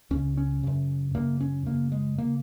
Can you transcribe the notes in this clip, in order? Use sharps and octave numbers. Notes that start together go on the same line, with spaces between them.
C#2 C#3 C#4
C#4
F#2 C#3
F#2 C#3 A#3
C#4
F#2 C#3 A#3
G#3
C#3 A#3